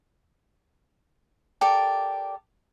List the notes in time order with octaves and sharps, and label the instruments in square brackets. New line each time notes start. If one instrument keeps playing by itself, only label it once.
[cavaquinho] G4 A4 A#4 D5